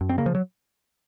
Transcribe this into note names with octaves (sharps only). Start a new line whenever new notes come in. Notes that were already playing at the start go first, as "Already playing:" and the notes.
F#2
C4
C#3 A#3
F3
F#3